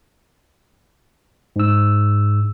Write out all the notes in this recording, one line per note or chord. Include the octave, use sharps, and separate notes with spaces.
G#2 E6